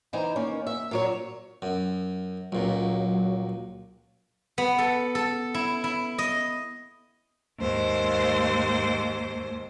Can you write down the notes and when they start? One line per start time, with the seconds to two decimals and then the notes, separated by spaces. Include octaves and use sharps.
0.13 E3 D#4 C5 G#5 A#5
0.36 D#3 A#3 C#4
0.67 E5
0.91 A#2 F#3 C#5
1.62 F#2
2.52 C#2 A#2 F#3
4.58 B3
4.78 A4
5.15 A4
5.54 E4
5.84 E4
6.18 D#5
7.58 D#2 G#2 C5